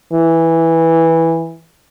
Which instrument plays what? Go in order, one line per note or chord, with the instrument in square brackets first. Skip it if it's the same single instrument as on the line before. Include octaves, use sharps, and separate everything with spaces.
[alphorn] E3